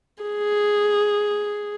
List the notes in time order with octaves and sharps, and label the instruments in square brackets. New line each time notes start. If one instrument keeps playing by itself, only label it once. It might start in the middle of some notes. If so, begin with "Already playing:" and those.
[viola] G#4